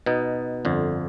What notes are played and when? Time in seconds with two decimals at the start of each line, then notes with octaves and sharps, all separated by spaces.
0.06 B2 B3 D#4
0.65 G1 F2 D3